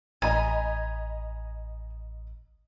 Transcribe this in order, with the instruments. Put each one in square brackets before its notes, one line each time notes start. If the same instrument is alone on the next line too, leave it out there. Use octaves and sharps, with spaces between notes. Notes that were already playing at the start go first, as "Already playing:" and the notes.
[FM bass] A1 [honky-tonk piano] D#5 A#5 B5 [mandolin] G#5